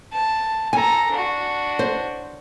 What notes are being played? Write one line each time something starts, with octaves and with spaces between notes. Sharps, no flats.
A5
A4 G#5 A#5
D4 F#4
C5